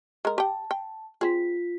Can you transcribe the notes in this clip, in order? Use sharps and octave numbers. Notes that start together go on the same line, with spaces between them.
G#3 A#4
G4 G5 A5
G5
C4 F4 G#4 B6